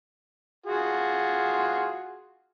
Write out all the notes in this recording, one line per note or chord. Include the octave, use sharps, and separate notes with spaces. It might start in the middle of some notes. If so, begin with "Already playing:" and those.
F4 F#4 G#4